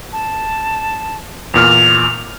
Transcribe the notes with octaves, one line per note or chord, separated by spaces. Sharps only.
A5
E2 A#2 F6 F7